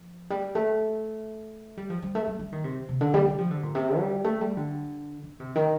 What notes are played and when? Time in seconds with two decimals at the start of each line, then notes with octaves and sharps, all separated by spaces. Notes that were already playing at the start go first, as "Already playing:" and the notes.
Already playing: F3
0.30 G3
0.55 A3
1.77 G3
1.90 F3
2.02 G3
2.15 A3
2.27 G3
2.39 G3
2.52 D#3
2.64 C3
2.89 C3
3.01 D3
3.14 G3
3.26 G3
3.38 F3
3.51 D3
3.63 A#2
3.75 C3
3.99 G3
4.24 A3
4.41 G3
4.57 D3
5.23 D3
5.40 C3
5.55 D#3